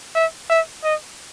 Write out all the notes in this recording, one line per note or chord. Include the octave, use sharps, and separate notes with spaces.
E5
E5
D#5